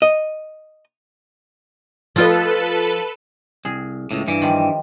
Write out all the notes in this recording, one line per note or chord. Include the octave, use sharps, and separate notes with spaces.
D#5
F3 F4 A4 B4 D#5
C2 G#4
C#2 A2
G2 E3
D#3 F3 G3